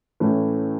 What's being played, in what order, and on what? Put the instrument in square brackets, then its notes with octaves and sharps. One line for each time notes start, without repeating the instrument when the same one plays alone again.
[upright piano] A2 E3 A3 C#4